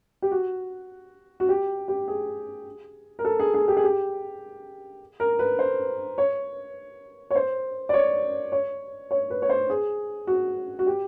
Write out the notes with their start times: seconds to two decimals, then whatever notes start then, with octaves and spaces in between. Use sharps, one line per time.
0.22 G4
0.31 F#4
1.40 F#4
1.49 G4
1.88 G4
2.08 G#4
3.19 A#4
3.25 A4
3.40 G#4
3.54 G#4
3.68 G4
3.77 G#4
3.84 G4
5.20 A#4
5.39 B4
5.59 C5
6.18 C#5
7.31 C#5
7.35 C5
7.89 D5
7.93 C#5
8.52 C#5
9.11 C#5
9.30 B4
9.42 C#5
9.50 C5
9.70 G#4
10.27 F#4
10.79 F#4
10.87 G4